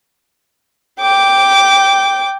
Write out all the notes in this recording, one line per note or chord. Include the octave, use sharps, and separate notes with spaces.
G5 D6